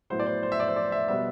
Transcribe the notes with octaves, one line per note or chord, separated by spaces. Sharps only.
A2 F#3 B3 E4 C5
D5
C5
C5
E5
D5
C5
D5
E5
B2 G3 B3 E5